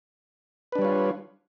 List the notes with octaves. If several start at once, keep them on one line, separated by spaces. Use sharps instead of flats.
G3 D4 F4 B4 C#5